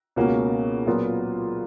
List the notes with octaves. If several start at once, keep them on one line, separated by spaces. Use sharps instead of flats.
C#2 B2 A#3 C#4 F#4
A#2 F#3 B3 F4 A#4